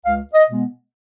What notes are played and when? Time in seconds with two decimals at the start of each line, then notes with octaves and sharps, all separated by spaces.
0.05 C#2 F5
0.34 D#5
0.49 B2 G#3 B3